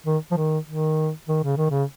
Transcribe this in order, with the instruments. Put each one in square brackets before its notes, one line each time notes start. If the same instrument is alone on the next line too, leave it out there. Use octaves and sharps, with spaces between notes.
[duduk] D#3
F3
D#3
D#3
D#3
C#3
D#3
C#3